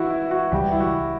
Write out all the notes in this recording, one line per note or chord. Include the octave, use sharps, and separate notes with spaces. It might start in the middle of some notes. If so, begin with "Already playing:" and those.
Already playing: E3 E4 F#4
E4
F#4
C#2 C#3 E3 G3 G4
E4
F#4